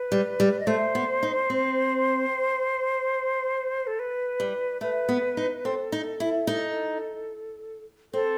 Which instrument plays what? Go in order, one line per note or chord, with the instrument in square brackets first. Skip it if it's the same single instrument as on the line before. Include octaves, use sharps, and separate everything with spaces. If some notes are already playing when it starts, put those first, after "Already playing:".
Already playing: [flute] B4
[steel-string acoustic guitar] G3
G3
[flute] D#5
[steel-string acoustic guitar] A3 [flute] C5
[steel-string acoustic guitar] B3
D#4
C4
[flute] A4
B4
[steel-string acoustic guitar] G3
[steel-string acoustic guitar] A3 [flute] B4
[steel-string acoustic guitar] B3
D#4
[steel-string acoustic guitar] C4 [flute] A4
[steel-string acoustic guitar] D#4
E4
D#4
[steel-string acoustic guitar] C4 [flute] A4